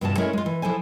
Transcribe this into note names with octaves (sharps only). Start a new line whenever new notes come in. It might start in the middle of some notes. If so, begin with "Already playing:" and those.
G2 C3 F3 F#4 A5
G#3 A3 C#4 E4 A#4 C#5
G#3 F4
E3
F3 E4 A4 C5 G#5